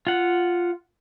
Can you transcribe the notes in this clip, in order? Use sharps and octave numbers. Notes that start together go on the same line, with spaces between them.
F4 F#5